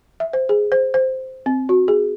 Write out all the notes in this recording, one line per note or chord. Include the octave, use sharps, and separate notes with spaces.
E5
C5
G#4
C5
C5
C4
F#4
G#4